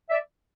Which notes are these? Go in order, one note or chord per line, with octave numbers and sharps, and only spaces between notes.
D5 E5